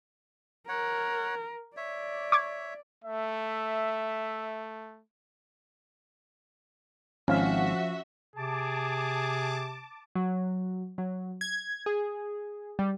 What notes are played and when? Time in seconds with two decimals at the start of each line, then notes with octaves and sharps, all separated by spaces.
0.68 A#4 C#5 F#5
1.77 C#5 D5 E5
2.32 C#6 D6 G#6
3.04 A3 E5
7.28 G#1 F3 C#4 F#4 E5 F5
8.36 C3 G#4 A5 D6
10.15 F#3
10.98 F#3
11.41 G#6
11.86 G#4
12.79 G3